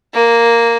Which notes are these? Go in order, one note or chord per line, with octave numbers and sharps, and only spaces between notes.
A#3